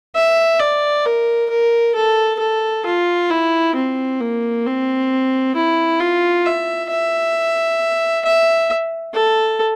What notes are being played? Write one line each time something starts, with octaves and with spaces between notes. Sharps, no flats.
E5
D5
A#4
A#4
A4
A4
F4
E4
C4
A#3
C4
E4
F4
E5
E5
E5
A4